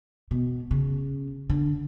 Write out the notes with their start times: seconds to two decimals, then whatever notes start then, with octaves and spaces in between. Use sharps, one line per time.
0.31 B2
0.71 C#3
1.50 D3